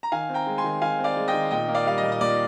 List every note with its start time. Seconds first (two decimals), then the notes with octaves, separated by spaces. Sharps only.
0.03 A#5
0.12 D#3 F5 G#5
0.29 C4
0.34 G5 A#5
0.46 G#3
0.58 G#5 C6
0.64 D#3
0.82 D#3 F5 G#5
0.99 C4
1.04 D5 F5
1.17 G#3
1.28 D#5 G5
1.33 D#3
1.51 A#2 D#5 G5
1.68 A#3
1.74 D5 F5
1.86 G3 F5
1.98 D#5
2.03 A#2
2.12 D#5
2.21 A#2 D5